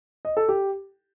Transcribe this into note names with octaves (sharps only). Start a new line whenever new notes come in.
D#5
A4
G4